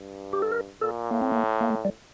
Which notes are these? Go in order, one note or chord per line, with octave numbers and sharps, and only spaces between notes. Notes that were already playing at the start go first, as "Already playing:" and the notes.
Already playing: G2
G4
A4
A#4
A#2 A4
A2 A#3
C4
A#3
A#3
A3
G3